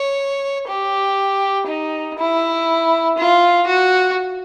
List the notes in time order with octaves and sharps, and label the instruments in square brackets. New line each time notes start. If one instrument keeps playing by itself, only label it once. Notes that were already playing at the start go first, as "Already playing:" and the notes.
Already playing: [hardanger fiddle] C#5
G4
D#4
E4
F4
F#4